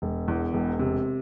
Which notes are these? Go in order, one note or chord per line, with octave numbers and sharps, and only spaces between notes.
E1
E2
E1
C3